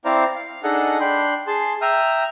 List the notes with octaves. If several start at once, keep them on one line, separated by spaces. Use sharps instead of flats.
C4 E4 C5 D5 F5 A#5
F5
D4 D#4 G#4 A4 D#5 F#5
D4 G5 B5 C6
G#4 A5 C6
E5 G5 A#5 D#6 F6